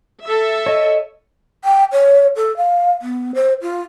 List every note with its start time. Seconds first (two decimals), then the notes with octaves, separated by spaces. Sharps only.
0.22 A4 E5
0.66 C#5 D#5
1.65 G5
1.92 C#5
2.36 A4
2.57 F5
3.02 B3
3.35 C5
3.62 F4